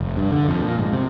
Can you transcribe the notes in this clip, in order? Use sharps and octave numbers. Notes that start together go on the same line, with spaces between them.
F1
G2
D3
F2
A#2
G#2
C3